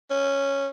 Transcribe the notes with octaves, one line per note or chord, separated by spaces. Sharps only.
C#4